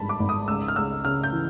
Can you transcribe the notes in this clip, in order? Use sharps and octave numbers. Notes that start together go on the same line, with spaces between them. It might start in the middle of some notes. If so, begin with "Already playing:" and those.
Already playing: G#1 G2 A5 B5
D6
G#1
D#6
C#2 E6
F6
C#2 E6
C#3 F6
G6
E3